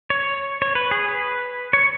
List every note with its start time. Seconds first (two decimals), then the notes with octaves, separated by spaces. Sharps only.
0.10 C#5
0.62 C#5
0.75 B4
0.91 G#4
1.08 B4
1.73 C#5